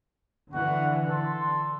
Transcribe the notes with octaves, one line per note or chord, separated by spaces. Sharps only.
D3 E3 F#4 F#5
D3 A4 C6